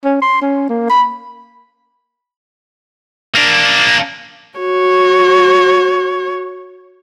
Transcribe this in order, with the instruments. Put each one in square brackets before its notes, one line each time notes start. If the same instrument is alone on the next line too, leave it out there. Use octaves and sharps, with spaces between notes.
[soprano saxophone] C#4
C6
C#4
A#3
B5
[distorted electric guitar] A#3 D4
[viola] F#4 C#5